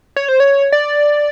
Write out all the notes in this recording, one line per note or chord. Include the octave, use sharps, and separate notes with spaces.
C#5
C5
C#5
D5